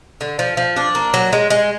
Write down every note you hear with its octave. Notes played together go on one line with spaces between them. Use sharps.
D3
F3
F3
D4
A#3
F#3
G#3
G#3